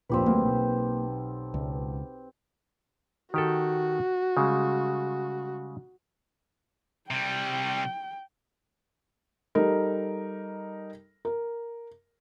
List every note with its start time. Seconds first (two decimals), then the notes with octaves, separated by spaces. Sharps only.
0.09 A#1 F2 A#3 C4 G4 B4
0.26 D2 F#3 A#3
0.44 B1
1.54 C#2
3.34 D#3 F#4 G4 A4
4.37 C#3 G3 G#3
7.11 C3 G3 G5
9.55 G3 D#4 A4 A#4
11.25 A#4